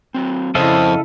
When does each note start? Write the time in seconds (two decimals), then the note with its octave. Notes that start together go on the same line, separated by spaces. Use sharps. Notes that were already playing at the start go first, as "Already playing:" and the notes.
0.14 F#3 C4
0.55 F2 C#3 E4 A4 C5 D5 D#5 F5